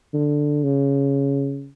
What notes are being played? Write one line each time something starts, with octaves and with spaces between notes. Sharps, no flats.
D3
C#3